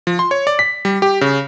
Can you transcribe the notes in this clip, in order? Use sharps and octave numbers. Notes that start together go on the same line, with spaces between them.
F3
C6
C#5
D5
B6
G3
G4
C#3